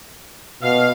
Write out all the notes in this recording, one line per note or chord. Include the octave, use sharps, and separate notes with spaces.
B2 F5